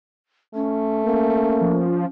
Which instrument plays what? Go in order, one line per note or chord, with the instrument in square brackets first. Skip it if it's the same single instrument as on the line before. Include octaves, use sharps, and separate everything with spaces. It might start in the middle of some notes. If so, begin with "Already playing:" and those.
[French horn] A3 [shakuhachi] C#4
[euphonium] A#3 [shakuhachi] C#4
[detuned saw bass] F3